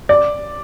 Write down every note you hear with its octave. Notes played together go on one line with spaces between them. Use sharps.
D5